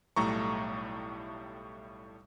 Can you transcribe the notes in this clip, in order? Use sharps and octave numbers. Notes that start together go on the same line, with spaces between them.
B1 A2 G3 A3 A#5 C#6